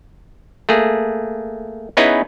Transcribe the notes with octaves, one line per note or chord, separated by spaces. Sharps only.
A3 A#3 G#4
B3 C#4 D#4 E4 G#4 B4